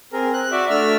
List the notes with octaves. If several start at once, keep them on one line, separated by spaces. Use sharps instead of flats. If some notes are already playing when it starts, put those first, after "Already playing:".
C4 G#4 A#4
F#6
F#4 D5 E5
A3 D4 E6 F6